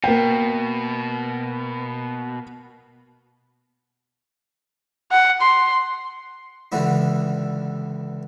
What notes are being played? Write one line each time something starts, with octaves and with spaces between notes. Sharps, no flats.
B2 A#3 G5
F#5
C6
C#2 D3 E3 G3 E4 F#4